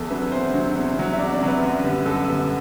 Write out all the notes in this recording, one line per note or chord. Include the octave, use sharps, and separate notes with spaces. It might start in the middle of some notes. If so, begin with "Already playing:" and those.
Already playing: E2 A4
C3 F#3 B4
E2 C5
C3 F#3
E2
C3 F#3
E5
E2 D5
D5
C3 F#3
B4
F#2
D3 G3 B3
F#2 A4
D3 G3 B3